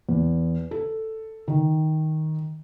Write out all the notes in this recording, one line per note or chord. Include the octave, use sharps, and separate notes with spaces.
E2
A4
D#3